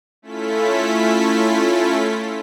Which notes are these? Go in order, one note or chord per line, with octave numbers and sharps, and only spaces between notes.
A3 C#4 E4 F4 A4 B6